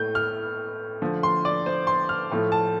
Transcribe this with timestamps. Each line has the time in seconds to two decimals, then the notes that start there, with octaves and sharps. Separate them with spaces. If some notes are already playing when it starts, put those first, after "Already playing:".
Already playing: A2 A3 G6
0.15 F6
1.02 D3 F3 A3
1.23 C6
1.45 D5
1.66 C5
1.87 C6
2.09 F6
2.31 A2 F3 A3
2.52 A5